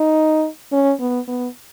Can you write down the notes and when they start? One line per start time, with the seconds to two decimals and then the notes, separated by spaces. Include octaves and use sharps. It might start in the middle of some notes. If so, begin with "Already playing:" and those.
Already playing: D#4
0.72 C#4
1.00 B3
1.28 B3